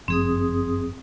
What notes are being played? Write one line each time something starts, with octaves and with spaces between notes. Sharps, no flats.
G1 F#2 F3 C4 G#4 D#6